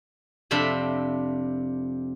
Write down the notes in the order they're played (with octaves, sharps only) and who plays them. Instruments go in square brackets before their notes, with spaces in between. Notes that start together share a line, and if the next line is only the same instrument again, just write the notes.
[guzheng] F2 C3 D4 E5 B5